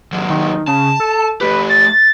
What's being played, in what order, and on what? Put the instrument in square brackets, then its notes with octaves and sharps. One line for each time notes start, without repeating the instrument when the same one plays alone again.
[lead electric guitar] D#2 F#3
[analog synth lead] D#3
[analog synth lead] C#3 [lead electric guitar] A5
[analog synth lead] A4
[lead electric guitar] A3 G4 [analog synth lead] B4
[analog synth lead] A6